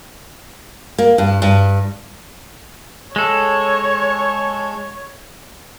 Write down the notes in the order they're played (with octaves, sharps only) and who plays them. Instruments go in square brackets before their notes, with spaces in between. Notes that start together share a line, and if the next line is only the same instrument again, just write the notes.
[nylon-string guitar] A#3
G2
G2
[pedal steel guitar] G#3 A4 [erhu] C#5